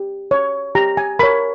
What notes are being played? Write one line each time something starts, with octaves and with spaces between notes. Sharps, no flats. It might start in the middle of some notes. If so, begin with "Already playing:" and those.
Already playing: G4
C#5
G4 A#5
G#5
A#4 C#5 B5